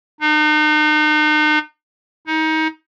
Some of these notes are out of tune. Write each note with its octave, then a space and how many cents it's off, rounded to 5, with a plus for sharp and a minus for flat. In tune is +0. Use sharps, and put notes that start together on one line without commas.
D#4 -40
D#4 +25